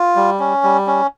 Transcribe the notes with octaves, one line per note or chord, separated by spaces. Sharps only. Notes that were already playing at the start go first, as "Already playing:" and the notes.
Already playing: F4
G3
C#4
G3
C#4